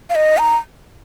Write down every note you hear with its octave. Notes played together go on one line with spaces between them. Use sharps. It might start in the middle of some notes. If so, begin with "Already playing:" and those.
F5
D#5
A#5